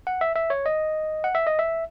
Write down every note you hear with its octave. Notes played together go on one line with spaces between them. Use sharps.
F#5
E5
E5
C#5
D#5
F#5
E5
D#5
E5